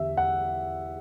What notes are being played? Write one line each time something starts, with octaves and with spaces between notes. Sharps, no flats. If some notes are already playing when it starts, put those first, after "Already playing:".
Already playing: E2 D3 G4 E5
F#5